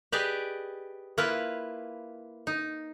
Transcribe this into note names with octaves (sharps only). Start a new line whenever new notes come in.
G4 G#4 B4 D5 D#5
A#3 E4 F4 B4
D#4